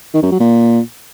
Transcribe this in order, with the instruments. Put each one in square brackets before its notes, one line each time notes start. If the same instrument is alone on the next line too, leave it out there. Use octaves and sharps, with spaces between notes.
[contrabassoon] D#3
F#2
F#3
A#2